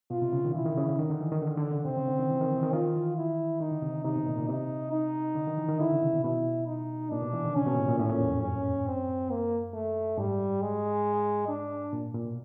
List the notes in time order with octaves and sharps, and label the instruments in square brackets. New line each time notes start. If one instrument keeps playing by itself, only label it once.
[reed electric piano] B2 [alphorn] F4
[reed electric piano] C3
C#3
D#3
[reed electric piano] E3 [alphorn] E4
[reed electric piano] D#3
C#3
D3
[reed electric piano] D#3 [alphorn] D#4
[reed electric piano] D3
E3
D#3
D3
D3
C#3
[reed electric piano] C3 [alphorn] C4
[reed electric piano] C#3
D3
D#3
E3
D#3
E3
D#3
[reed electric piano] D#3 [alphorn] F4
[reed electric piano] E3
[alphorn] E4
[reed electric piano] D#3 [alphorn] D#4
[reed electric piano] D3
C3
[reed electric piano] C3 [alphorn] D#4
[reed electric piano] B2
A#2
A#2
[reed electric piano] C3 [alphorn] D#4
[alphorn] D#4
[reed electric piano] D3
D#3
E3
D#3
[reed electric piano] D3 [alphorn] E4
[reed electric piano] C#3
C3
B2
[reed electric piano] B2 [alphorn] E4
[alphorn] D#4
[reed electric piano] A#2 [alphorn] D4
[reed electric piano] B2
E3
D#3
[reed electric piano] C#3 [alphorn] C#4
[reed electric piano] B2
A#2
A2
A#2
[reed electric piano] A2 [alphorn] C#4
[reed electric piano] A#2
E2
F2
[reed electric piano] F#2 [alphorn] C#4
[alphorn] C4
A#3
A3
[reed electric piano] G#2 [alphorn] G3
[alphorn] G#3
D4
[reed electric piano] A#2
A#2
B2